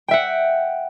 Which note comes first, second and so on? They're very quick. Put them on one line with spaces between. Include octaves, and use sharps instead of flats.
G5 E5 F#5